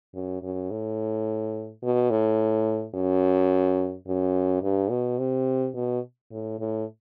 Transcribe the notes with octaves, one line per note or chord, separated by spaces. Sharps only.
F#2
F#2
A2
B2
A2
F#2
F#2
G2
B2
C3
B2
A2
A2